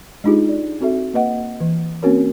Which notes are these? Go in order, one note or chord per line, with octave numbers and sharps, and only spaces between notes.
G#3 D4 D#4 F4 G4 G#4
D5
C4 F#4 A4 E5
A#3 B4 D#5 F#5
E3
A#3 C4 C#4 F#4 A#4 C#5